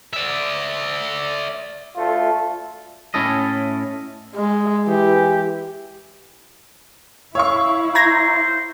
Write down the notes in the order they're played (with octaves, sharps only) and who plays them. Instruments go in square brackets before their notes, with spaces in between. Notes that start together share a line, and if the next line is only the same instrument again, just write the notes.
[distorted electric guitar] D5 E5
[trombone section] D2 A3 F4
[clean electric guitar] A2 C#4 E4 A4 D#5
[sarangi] G#3
[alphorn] E3 [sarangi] G4
[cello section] E4 [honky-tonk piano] C#5 F5 C#6 [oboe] E6
[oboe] C5 [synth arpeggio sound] A#5 G#6 A#6